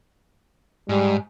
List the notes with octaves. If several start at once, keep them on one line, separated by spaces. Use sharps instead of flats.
G#2 G3